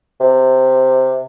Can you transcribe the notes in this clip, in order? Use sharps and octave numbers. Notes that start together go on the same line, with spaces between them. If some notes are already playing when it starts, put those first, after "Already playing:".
C3